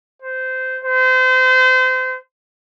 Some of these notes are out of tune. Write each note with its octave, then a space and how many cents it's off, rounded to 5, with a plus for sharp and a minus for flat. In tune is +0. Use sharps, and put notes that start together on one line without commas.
C5 -15
C5 -30